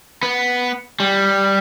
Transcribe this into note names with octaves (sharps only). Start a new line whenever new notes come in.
B3
G3